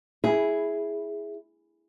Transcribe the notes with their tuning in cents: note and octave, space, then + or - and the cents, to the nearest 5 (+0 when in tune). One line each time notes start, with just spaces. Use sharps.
E4 -5 G#4 +0